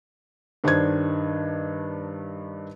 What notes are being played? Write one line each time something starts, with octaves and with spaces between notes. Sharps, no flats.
G2 D#3 D4 C5 D#5 G#6